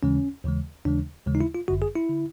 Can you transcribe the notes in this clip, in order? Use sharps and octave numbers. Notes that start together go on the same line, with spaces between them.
D#2 C#3 E3 G#3 C#4
D#2 C#3 E3 G#3
D#2 C#3 E3 G#3 D4
D#2 C#3 E3 G#3
D#4
E4
F4
G1 F#2 D3 F#4
G#4
E4
D3